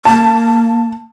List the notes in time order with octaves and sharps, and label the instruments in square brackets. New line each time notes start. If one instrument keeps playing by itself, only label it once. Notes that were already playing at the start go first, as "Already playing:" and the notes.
[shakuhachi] A#3 [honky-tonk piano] A5